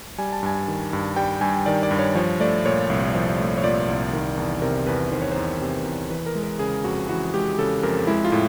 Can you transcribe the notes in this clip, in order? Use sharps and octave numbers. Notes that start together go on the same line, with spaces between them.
G3 G#5
A5
G2 G#5
D#3
G2
G3 G5
G2 G#5
D#3 D5
D5
G2
C#5
F3 C#5
A3 D5
A#2 C#5
C2
F3
A3
C#5
A#2 D5
C2
D#3
E2
C3 A#4
E2 B4
D#3 C5
C#5
E2 C5
C3
E2
E3 B4
A#4
G#3
A#4
C#3 G#4
F2 F#4
E3 F#4
G#3 G4
C#3 A4
F2 A#4
G#3 E4
F4
A2